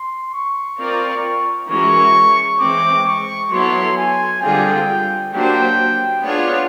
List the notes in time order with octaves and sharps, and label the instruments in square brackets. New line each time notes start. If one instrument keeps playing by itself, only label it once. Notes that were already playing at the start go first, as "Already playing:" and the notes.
Already playing: [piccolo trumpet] C6
C#6
[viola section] C4 F4 A#4 D5
[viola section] E3 G#3 C#4 F#4 A#4 [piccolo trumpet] C#6
[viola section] E3 G#3 C4 [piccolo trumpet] D6
[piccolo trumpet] C#6
[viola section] F#3 B3 E4 A4 C#5 [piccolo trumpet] C6
[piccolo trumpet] G#5
[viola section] D3 G3 C4 F4 G#4 [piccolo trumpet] G5
[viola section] F#3 A#3 D4 G4 C5 [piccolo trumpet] G5
[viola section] B3 D4 F4 G#4 C#5 [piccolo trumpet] F#5